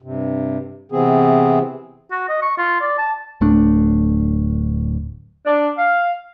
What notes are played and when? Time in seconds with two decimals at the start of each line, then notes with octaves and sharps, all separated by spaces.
0.02 G2 C3
0.92 C3 E3 B3 C4 G#4
2.11 F#4
2.29 D#5
2.42 C#6
2.58 F4
2.81 D5
2.98 A5
3.41 D1 A3 D4
5.46 D4
5.78 F5